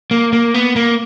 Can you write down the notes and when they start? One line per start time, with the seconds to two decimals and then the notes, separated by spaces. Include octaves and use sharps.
0.11 A#3
0.33 A#3
0.54 B3
0.76 A#3